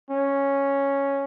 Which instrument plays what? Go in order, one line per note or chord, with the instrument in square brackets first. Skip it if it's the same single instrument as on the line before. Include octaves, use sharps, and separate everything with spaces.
[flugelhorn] C#4